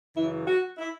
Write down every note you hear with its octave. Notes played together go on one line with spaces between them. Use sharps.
F#2 C#3 E3 E4
F#4
E4